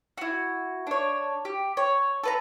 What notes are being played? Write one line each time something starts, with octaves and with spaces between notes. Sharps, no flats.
E4 F#4
D4 C#5
G4
C#5
A4 B4 A#5